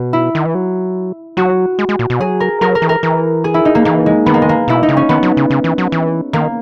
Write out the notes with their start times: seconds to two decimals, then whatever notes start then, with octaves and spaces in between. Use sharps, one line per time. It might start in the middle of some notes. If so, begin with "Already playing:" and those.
Already playing: B2
0.13 E4
0.35 D#3
0.45 E3
0.55 F#3
1.37 F#3 F#4
1.79 G#3
1.89 G#3
1.99 A#2
2.10 B2
2.20 F#3 G#4
2.40 A#4
2.61 F#3 A#4
2.75 A#4
2.82 E3
2.89 A#4
3.03 E3
3.44 G#4
3.54 E4
3.65 D#4
3.75 A#3
3.85 E3 A#3
4.06 G#3
4.26 D#3 B3
4.34 A#3
4.42 G#3
4.49 A#3
4.68 B2 E4
4.83 D#4
4.89 C#3
4.97 C#4
5.09 D#3 B3
5.23 F#3
5.37 C#3
5.50 C#3
5.64 E3
5.78 F#3
5.92 E3
6.33 D#3 A#3